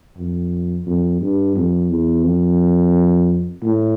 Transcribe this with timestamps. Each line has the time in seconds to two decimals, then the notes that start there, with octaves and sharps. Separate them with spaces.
0.18 F2
0.86 F2
1.21 G2
1.56 F2
1.90 E2
2.25 F2
3.64 A2